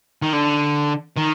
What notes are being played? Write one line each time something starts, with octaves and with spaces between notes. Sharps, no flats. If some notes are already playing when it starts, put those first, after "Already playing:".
D#3
D3
D#3